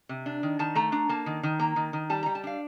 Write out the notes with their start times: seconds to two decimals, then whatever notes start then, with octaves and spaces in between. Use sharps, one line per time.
0.09 C3
0.26 D4
0.43 D#3
0.59 D#3 A5
0.75 A3 A#5
0.92 D4 A#5
1.09 A#3 A5
1.26 D#3
1.43 D#3
1.59 A#3 A#5
1.76 D#3
1.93 D#3
2.10 G3 A5
2.23 G3 A#5
2.35 A5
2.44 D4 F5